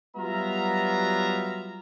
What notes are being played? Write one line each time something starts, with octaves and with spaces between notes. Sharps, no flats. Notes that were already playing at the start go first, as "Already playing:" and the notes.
F#3 G3 B3 F4 E5 A#5